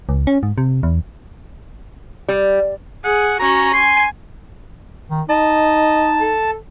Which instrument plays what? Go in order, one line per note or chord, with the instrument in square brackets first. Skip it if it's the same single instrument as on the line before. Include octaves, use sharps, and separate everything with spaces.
[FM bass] C#2
C#4
G#2
C3
E2
[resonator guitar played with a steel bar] G3
[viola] G#4 [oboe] F#5
[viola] C#4 F#4 [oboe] A#5
[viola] G#5 [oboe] C6
[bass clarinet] D#3
[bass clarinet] D#4 [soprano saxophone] D#5 [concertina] A5
[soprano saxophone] A4